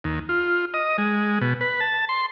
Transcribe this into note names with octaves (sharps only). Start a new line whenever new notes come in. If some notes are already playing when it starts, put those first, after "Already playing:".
D#2
F4
D#5
G#3
B2
B4
A5
C6